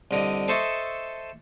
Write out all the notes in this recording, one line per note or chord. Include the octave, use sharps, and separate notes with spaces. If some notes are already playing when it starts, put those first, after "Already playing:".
C2 D3 D#5
A4 C5 D#5 E5 A5 C#6